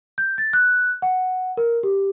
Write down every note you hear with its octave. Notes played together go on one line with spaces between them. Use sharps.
G6
A6
F#6
F#5
A#4
G4